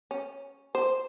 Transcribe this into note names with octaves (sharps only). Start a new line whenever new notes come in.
C#4
C5